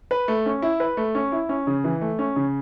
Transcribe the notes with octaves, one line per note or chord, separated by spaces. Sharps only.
B4
A3
C#4
E4
B4
A3
C#4
E4
C#4
C#3
E3
A3
C#4
C#3